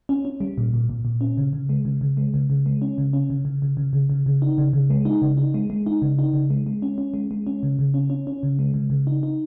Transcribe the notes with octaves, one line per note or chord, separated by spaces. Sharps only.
C#4
C#4
G3
A#2
A#2
A#2
A#2
C#4
C#3
C#3
G#3
C#3
C#3
G#3
C#3
C#3
G#3
C#4
C#3
C#4
C#3
C#3
C#3
C#3
C#3
C#3
C#3
D#4
C#3
C#3
G#3
D#4
C#3
D#4
G#3
G#3
D#4
C#3
D#4
C#3
G#3
G#3
C#4
C#4
G#3
G#3
C#4
C#3
C#3
C#4
C#4
C#4
C#3
G#3
C#3
C#3
D#4
D#4